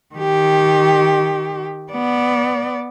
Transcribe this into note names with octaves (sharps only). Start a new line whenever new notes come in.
D#3 G4
B3 D5